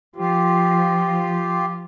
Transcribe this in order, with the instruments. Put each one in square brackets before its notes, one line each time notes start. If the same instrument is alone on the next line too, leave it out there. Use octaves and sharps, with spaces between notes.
[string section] F3 [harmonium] F4 G4